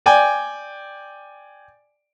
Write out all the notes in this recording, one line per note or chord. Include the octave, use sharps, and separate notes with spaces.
D5 G5 G#5